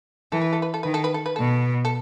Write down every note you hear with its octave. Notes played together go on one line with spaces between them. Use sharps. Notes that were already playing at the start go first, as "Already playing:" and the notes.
E3 A4
B4
A4
B4
A4
D#3 B4
A4
B4
A4
B4
B2 A4
A4